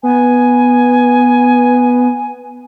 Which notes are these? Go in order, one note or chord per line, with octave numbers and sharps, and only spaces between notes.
B3 G#5